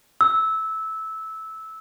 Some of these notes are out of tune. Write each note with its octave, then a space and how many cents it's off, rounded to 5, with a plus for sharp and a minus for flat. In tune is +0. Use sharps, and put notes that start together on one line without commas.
E6 -15